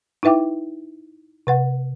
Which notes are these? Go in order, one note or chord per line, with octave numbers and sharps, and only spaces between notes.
D#4 E4 B4 E5 G5 D6
C3 B4 F#5